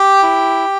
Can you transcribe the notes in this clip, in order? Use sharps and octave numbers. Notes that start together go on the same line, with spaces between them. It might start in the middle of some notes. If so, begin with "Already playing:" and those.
Already playing: G4 G5
E4